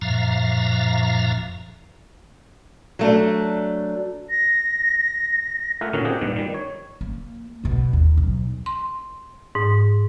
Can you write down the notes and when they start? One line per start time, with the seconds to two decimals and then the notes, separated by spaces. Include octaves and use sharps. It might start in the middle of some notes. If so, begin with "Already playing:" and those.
0.02 F#2 A#2 F3 E5 F5 A#5
2.99 F#3 A3 D4
4.30 A#6
5.81 A3 F4 A#4 E5 F#5 G#5
5.93 A#2 D3 D#3 C#4 D#4 F#4
6.05 C4 F4 G4 G#4 D#5 F#5
6.21 G2 A#2 D#3
6.36 D#3 G3
6.54 C#5
7.01 A#3
7.64 B1 B2
7.93 D#2
8.17 B1
8.66 C6
9.55 G#2